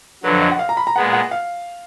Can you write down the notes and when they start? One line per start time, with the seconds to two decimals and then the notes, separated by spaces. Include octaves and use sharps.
0.23 F2 D3 F#3 B4
0.41 D#5
0.51 F#5
0.59 F5
0.69 A#5
0.77 B5
0.87 A#5
0.96 A#2 G#3 B3 F#5
1.13 F#5
1.31 F5